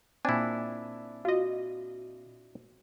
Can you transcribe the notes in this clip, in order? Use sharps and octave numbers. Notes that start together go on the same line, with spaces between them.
A#2 C4 D4 E4 G#5
F4 F#4 D#5